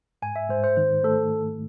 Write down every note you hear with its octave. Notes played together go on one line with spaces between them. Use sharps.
G#2 G#5
E5
G#2 C5
C5
D#3 C5
A3 A4